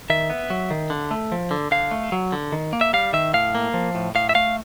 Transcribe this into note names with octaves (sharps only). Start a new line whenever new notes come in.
D#3 E5
B3
F#3
D#3
D3
A3
F3
D3
D3 F5
A3
F#3
D3
D#3
A#3
E5
G3 F5
D#3 E5
A2 F5
A#3
F3
A2
A2 F5
E5
A3 F5